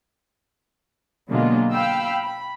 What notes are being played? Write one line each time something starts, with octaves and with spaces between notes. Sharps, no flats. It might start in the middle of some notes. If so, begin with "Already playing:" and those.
B2 D3 F#3 G#3 A#3 F4
F5 G5 B5 E6
B5